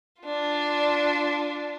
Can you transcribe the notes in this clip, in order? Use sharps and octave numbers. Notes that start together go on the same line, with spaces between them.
D4 F4